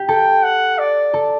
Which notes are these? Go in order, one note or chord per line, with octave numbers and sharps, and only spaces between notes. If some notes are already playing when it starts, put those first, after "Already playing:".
Already playing: G4
A4 G5
F#5
D5
A4